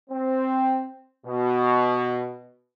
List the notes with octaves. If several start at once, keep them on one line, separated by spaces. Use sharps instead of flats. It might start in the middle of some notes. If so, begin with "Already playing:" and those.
C4
B2